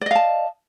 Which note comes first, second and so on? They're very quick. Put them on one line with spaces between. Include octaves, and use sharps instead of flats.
D5 D#5 F5 A5